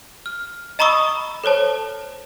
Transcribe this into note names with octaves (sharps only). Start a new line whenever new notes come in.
F6
D#5 A#5 B5 C#6 D#6 E6
A4 C5 C#5 A5